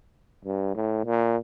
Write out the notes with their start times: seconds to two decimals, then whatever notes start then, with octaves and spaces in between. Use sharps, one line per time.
0.45 G2
0.75 A2
1.05 A#2